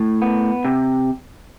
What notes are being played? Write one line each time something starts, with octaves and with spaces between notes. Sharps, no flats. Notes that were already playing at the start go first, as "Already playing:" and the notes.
Already playing: A2
B3
C3